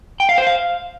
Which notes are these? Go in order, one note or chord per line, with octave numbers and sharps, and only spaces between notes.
G5
F5
C5
F5